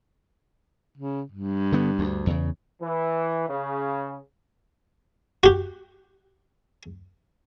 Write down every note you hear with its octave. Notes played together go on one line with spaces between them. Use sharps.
C#3
G2
D3 B3
D2
E2 C#3
E3
C#3
F#4 G4